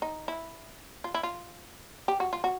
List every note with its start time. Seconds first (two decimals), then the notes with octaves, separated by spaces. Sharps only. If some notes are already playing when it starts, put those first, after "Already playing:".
0.02 D#4
0.28 E4
1.04 F4
1.14 E4
1.23 F4
2.08 G4
2.20 F#4
2.33 F4
2.44 F#4